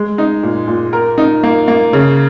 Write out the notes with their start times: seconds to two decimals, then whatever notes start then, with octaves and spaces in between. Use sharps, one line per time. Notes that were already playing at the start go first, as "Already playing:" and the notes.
Already playing: G#3
0.18 D#4
0.43 A#2
0.68 A#2
0.93 A#4
1.18 D#4
1.43 A#3
1.68 A#3
1.93 C#3